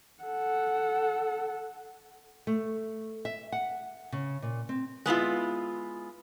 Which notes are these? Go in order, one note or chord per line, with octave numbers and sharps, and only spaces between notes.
A4 F#5
A3
E5
F#5
C#3
A#2
C4
G#3 B3 E4 F4